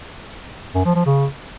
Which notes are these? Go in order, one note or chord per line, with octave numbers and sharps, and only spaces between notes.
F#2
F3
F3
C#3